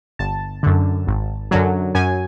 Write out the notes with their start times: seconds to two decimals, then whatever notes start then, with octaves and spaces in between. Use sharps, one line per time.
0.19 G1 A5
0.63 F#2 D3
1.07 G#1
1.51 F#2 D3 F#3
1.95 F#2 G#5